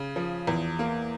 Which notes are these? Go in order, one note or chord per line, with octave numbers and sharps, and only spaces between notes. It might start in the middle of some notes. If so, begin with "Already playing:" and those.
Already playing: C#3
F3
E2
A#3